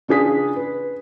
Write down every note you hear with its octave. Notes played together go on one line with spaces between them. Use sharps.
C#3 D4 F4 G#4 D#6 B6
B4